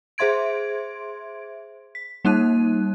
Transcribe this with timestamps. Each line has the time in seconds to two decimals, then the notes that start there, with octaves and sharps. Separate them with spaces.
0.18 G#4 C5 E5 C6 G#6 D7
1.95 B6
2.25 G3 A#3 D#4 F#6 D#7